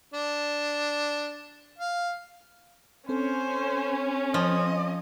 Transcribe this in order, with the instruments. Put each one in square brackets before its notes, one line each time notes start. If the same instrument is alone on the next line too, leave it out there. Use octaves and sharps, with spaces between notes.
[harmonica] D4
F5
[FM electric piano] C4 A4 [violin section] C#4 [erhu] C5
[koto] F3 [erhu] D#5